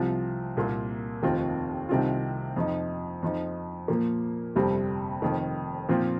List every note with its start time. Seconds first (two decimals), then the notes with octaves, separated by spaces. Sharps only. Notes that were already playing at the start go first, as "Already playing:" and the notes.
Already playing: C2 C3 F3 C4 F4
0.57 C2 A#2 A#3 F4
1.22 F1 D#2 D#3 C4 F4
1.89 C2 C3 D#3 C4 F4
2.56 F2 F3 D#4
3.23 F2 F3 D#4
3.88 A#2 F3 A#3
4.55 G1 F2 C3 G3 C4
5.22 F1 F2 D#3
5.89 A#2 F3 C4 F4